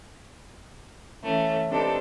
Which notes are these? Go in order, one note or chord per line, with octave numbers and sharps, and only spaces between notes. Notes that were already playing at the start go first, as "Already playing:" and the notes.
E3 A3 C#4
C4 D4 D#4 G4 A4 B4